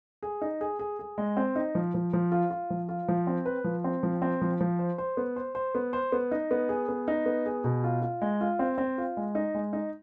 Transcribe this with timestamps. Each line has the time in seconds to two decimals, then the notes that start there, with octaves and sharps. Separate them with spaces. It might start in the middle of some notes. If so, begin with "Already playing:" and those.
0.23 G#4
0.41 D#4
0.61 G#4
0.79 G#4
0.99 G#4
1.18 G#3
1.37 C4
1.56 D#4
1.75 F3
1.94 F3
2.13 F3
2.32 F4
2.50 F4
2.70 F3
2.89 F4
3.08 F3
3.27 C4
3.46 B4
3.64 F3
3.84 C4
4.03 F3
4.22 C4
4.41 F3
4.61 F3
4.79 C5
4.98 C5
5.17 B3
5.36 C5
5.55 C5
5.75 B3
5.93 C5
6.12 B3
6.31 D#4
6.51 B3
6.69 G#4
6.89 B3
7.08 D#4
7.26 B3
7.46 G#4
7.64 B2
7.84 F4
8.02 F4
8.22 G#3
8.41 F4
8.59 C4
8.78 C4
8.98 F4
9.17 G#3
9.35 D#4
9.55 G#3
9.73 D#4